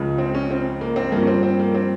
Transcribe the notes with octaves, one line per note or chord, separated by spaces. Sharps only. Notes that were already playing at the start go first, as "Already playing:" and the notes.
Already playing: C#2 C#3 F3
C4
C#4
C4
A#3
C4
G2 F3 A#3
C#4
C4
C4
A#3
C4